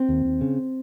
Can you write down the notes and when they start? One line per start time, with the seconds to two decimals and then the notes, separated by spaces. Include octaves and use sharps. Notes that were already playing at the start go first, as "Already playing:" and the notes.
Already playing: C4
0.09 D#2
0.25 D#2
0.41 C#3